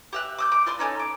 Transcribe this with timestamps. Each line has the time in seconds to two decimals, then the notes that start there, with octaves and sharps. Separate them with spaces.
0.13 G4 E5 F#6
0.38 D6 E6 G6
0.52 D6
0.66 F4 D5 C6
0.79 A3 A#3 C#4 D#4
0.99 D6